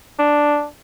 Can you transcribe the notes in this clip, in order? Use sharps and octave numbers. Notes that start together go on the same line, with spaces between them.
D4